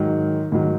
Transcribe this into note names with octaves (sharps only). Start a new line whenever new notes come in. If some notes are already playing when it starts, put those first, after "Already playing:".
Already playing: G#2 D#3 F#3
G#2 D#3 F#3